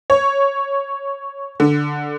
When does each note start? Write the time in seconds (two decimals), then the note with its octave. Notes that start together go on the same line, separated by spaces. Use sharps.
0.10 C#5
1.60 D3